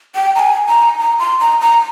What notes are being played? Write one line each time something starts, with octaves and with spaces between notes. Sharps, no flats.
G5
A#5
G#5
A#5
A#5
C6
A#5
A#5